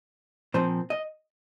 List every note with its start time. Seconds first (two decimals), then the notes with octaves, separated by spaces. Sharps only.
0.54 A#2 F3 C4 C5
0.90 D#5